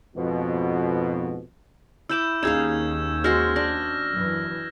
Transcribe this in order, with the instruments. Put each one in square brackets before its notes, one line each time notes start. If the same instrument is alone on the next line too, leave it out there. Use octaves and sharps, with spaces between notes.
[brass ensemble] F2 G#2 B2
[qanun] E4 B5 D6 [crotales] E6 G6 E7
[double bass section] D#2 C#4 [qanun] D#4 G#4 F5 [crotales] E6 G#6 E7
[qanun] G#3 F#4 C5 [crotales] F6 A#6
[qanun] D4 [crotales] A#6
[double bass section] F#2 E3